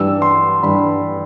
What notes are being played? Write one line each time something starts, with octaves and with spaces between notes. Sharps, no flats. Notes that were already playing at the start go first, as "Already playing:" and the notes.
Already playing: G2 E3 G3 E6
C6
G2 E3 G3 B5